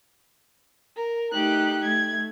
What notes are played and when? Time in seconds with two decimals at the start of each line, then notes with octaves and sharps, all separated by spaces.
0.96 A#4
1.32 A3 D#4 G4 F#6
1.84 A3 G#6